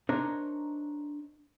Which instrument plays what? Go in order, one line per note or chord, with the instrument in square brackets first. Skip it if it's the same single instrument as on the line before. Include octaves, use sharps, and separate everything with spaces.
[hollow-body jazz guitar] D4 D#4 A#4 C5 C#5